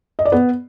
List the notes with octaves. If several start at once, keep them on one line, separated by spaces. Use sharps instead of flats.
D#5
D5
B3